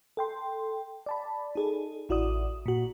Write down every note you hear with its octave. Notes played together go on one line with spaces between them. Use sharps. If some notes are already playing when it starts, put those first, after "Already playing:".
A4 G5 C6
D5 A5 B5
D#4 G#4 A4
A1 E4 F#4 D5 D#6
A#2 F#4